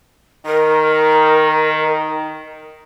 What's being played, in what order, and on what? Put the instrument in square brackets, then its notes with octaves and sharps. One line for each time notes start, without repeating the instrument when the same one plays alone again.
[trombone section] D#3 [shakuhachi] A#4